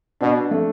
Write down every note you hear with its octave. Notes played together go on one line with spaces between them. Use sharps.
B2 D4
A3